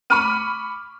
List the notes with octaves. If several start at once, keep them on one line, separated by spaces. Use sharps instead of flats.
B5 C#6 D6 F6 D#7